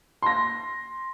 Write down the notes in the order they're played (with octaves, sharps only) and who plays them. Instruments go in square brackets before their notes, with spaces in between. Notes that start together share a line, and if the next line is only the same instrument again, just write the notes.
[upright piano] C6 A#6